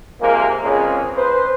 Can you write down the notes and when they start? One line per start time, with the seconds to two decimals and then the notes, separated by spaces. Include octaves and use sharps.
0.21 C3 F3 G#3 A#3
0.64 C#2 A#2 C#3 G#3 C4 C#4
1.16 B4 C5